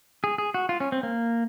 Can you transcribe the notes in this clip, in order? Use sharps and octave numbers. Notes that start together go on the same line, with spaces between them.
G#4
G#4
F#4
F4
C#4
C4
A#3